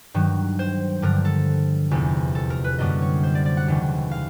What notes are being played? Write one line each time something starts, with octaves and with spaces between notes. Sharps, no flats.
G2 D#3 F#3
C5
G2 D3 F3 A#4
A4
F1 E2 C3
A4
A#4
B4
F#2 D3 G3 A#3 D#5
C#5
C5
D5
D5
F#5
E1 D#2 C#3 E3
F5